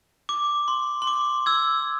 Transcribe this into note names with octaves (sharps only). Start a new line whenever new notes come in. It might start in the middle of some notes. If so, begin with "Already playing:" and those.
D6
C6
C6
D6
E6 G#6